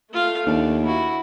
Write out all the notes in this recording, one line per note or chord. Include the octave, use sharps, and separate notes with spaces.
A3 F4 F5
D#2 D4
E4 F#4